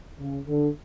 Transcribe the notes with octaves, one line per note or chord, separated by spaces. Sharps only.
C#3
D3